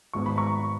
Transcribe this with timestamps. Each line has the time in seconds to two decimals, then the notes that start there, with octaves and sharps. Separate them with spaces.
0.13 G#1 G#2 D#3 G#3 B3 C#6
0.26 B5
0.37 A#5 C#6